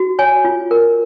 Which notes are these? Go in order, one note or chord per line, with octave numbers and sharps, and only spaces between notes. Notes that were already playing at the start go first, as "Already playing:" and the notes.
Already playing: F#4
C#5 G#5
F4
A#4